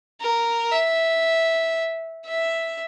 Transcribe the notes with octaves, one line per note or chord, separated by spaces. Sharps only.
A#4
E5
E5